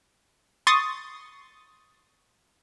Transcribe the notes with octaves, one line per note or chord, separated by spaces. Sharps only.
C6 C#6 D#6 A6